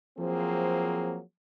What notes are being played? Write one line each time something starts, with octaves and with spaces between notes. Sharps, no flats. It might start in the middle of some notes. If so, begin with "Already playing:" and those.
F3 F#3 A#3 C4 G#4